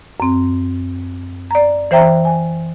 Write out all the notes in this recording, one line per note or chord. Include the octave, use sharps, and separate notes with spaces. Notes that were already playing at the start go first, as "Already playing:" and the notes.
F#2 C4
D5 A#5
E3 C5 E5 G5 A#5
G#5